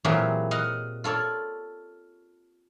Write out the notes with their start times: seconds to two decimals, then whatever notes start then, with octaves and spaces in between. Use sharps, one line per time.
0.04 A#2 E3 F#3 C4 G4 G#4
0.51 D#5 F5 F#5
1.04 F4 A4 C#5 D5